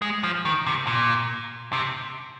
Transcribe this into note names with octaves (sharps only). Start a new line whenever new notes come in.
G#3
F3
D#3
C3
A#2
C3